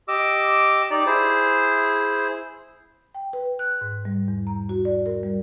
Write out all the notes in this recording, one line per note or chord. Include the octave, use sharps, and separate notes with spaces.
G4 D#5 D6 E6
D#4 G4 D5
E4 G#4 C5
G5
B4
F#6
G#2
G3
E2
A#5
F#4
D5
A#4
G3